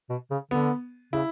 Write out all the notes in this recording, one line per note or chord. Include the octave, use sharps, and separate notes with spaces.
B2
C#3
D3 B3
C#3 E4